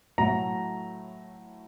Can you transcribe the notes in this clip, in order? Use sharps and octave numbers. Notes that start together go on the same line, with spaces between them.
A2 F#3 A3 A#5